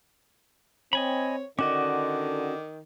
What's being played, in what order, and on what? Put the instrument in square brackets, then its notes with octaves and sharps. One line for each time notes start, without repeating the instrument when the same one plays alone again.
[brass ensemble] C4 [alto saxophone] C#5 [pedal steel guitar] D#5 G#5 B5
[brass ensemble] D3 [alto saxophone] D#3 [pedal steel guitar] C#4 F#4 D#5 [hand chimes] D6